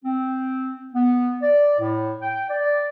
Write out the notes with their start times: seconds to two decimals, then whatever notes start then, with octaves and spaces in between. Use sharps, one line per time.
0.05 C4
0.94 B3
1.42 D5
1.79 A2
2.22 G5
2.49 D5